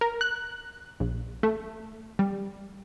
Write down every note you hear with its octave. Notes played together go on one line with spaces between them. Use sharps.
A#4
F#6
A#1
A3
G3